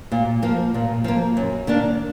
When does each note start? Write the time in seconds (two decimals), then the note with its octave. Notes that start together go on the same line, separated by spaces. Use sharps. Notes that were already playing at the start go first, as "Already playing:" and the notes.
0.12 A#2
0.42 F3 A#3
0.74 A#2
1.04 F3 A#3
1.37 F#2
1.67 D#3 A#3 D4